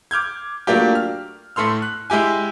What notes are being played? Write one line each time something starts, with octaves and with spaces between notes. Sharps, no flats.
D6 F6 G6 G#6
F#3 A3 A#3 D4 F4 G4
F6
A2 A3 A4 C6 F6
F#6
G#3 E4 G4 G#5